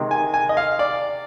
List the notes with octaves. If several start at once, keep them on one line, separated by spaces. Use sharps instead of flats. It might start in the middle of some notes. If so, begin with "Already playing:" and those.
Already playing: C3 D#3 G#3
G#5
G#5
D#5
F5
D5